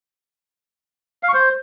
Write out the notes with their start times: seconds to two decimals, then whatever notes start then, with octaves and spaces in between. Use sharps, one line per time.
1.23 F5
1.28 C#6
1.34 C5